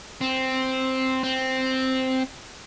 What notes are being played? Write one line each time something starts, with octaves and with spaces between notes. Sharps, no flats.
C4
C4